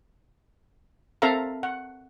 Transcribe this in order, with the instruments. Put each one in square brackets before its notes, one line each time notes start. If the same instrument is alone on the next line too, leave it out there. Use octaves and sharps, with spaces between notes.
[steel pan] C4 A4 A#4 E5 F5 A#5
F#5